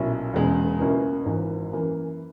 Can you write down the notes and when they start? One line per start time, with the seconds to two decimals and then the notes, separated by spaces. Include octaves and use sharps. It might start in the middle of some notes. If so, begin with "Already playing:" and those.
Already playing: B1 A#2 F#3 C#4 E4
0.33 E1 E2 C#3 G#3
0.80 C#2 B2 A#3 C#4 E4
1.25 G#1 G#2 E3
1.73 F#2 E3 A#3